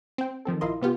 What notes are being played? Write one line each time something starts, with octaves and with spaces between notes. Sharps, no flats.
C4 G5
D#3 F3 C4 A4
A#1 E4 F4 A#4 D#5 C6
C3 B3 F4 G4